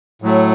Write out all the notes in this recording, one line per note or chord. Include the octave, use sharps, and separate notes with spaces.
A2 F#3 A3